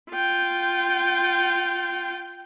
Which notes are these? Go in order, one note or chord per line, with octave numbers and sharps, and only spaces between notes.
F4 G5